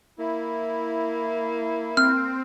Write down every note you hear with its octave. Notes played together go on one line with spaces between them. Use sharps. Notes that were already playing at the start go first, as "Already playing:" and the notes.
A#3 E4
C4 F6